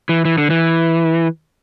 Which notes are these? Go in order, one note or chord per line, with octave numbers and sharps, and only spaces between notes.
E3
E3
D3
E3